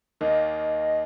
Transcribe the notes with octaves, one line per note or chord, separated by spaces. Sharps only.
D#2 D#3 A#3 D#5